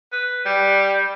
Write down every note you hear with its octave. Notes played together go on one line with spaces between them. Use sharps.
B4
G3